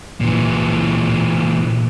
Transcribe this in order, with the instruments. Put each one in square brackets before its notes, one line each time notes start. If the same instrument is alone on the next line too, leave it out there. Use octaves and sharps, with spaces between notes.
[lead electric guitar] A#2 E3